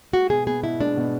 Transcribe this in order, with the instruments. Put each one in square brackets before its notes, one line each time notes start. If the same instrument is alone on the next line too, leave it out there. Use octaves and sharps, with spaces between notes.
[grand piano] G#3 [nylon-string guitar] F#4
[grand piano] B2 [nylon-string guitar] G#4
[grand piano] B3 [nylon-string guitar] G#4
[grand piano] B2 [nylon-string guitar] E4
[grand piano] G#3 [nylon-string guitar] D4
[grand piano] B2